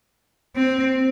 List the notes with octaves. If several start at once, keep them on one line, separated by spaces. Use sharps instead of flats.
C4